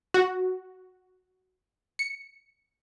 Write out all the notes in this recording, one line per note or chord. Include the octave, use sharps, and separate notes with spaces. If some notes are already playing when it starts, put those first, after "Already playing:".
F#4
C#7